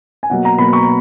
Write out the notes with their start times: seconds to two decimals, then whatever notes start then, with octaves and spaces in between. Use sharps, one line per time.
0.23 G#5
0.30 B2 F#3 A#3 F#5
0.45 A#5
0.58 B2 F#3 A#3 B5
0.73 C#6